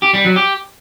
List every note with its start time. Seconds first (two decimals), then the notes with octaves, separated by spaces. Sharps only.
0.02 G4
0.13 G3
0.25 F#3
0.36 G4